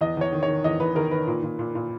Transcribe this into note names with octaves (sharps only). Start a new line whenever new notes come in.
E2 D#5
E2 C#5
D#3
C#5
D#3
E2 D#5
E2 B4
D#3 A#4
D#3 B4
A#2
A#2
A#2
A#2